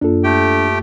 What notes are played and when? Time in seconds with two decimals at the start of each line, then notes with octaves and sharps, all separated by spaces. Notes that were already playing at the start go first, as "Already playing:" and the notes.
0.01 F#2 A#3 D4 F4 A4
0.24 A3 G4 G5